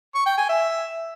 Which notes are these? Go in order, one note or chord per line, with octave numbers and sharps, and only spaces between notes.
C#6
G5
G#5
E5